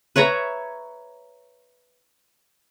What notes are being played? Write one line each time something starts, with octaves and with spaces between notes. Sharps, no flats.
B4 C#5 E5 A#5